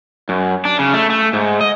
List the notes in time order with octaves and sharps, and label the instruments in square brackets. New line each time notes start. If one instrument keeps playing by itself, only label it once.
[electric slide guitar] F#2
D4
C#3
A3
A3
G#2
D#5